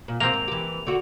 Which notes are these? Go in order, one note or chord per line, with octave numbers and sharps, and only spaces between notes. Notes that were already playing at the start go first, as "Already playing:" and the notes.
A#2
G#2 C3 F3 A#3 C4 F7
G#2
E3 G4
D3 F#4